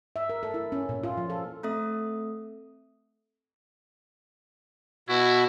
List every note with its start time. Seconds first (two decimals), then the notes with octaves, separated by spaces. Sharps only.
0.16 E5
0.29 A#4
0.43 A4
0.54 E4
0.72 C#4
0.89 A#2
1.04 F4
1.17 F3
1.30 A4
1.63 A3 C4 A4 E5 D#6
5.09 B2 E4 F#4